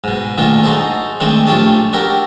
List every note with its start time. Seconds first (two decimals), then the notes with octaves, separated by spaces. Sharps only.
0.04 G#2 B2
0.38 A#2 D#3 A3 D4 F4
0.63 D#4 F#4 G#4 A4 C5
1.20 D#3 G#3 A3 C4 D4
1.47 A#1 A3 F4 G4 C#5 A5
1.93 D4 F#4 G4 A4 A#4